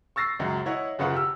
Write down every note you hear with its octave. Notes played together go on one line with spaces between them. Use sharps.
C#6 E6 A6 A#6 C7
C#2 F#2 F#3
E4 C#5 D#5 F#5
F#1 F#2 C#3 F4 B4 F#5
G4 E6